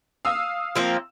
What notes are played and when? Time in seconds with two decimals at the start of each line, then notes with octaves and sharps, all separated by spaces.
0.25 F5 D#6 E6
0.76 F3 A#3 C4